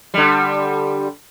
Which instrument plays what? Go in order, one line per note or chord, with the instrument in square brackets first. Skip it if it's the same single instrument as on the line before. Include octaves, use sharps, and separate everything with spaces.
[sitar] D3 G3